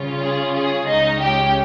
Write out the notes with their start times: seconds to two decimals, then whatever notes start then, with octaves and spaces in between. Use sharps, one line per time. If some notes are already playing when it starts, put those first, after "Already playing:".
Already playing: C#3 G3 C#4 F4
0.22 G#4
0.55 G#4
0.88 C#2 C#3 G#3 C#4 D#4 D#5
1.21 G4 G5